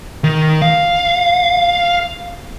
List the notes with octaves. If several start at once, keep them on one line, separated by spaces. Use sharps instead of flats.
D#3
F5